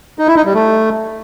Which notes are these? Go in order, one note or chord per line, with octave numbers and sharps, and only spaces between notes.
D#4
E4
D#4
G3
A3